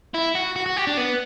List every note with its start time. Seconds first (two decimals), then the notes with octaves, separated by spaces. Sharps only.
0.14 E4
0.35 F#4
0.56 F#4
0.66 F#4
0.76 G4
0.87 D4
0.97 B3